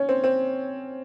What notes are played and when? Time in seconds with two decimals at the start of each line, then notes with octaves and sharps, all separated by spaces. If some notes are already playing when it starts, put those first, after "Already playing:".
Already playing: C#4
0.09 C4
0.24 C4